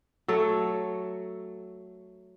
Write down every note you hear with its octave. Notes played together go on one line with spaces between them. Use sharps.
F#3 A3 A4 C#5